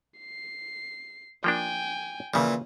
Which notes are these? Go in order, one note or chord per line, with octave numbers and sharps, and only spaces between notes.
C7
F3 A#3 D4 G5 G#5
A#2 C#3 E3 F3